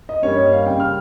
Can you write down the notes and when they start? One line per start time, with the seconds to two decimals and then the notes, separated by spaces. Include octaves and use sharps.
0.09 D#5
0.22 G2 G3 A#3 C#4 C#5
0.37 D#5
0.52 F5
0.66 C#3 G3 C#4 G5
0.80 F6